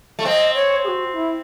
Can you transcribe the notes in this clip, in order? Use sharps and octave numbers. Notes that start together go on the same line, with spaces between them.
A3
C4 D#5
C#5
G#4
F#4
E4